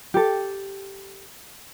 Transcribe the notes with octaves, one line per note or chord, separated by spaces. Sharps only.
G4 A4